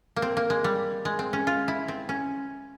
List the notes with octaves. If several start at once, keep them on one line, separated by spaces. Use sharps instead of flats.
A#3
C4
A#3
G#3
G3
G#3
C4
C#4
F4
E4
C4
C#4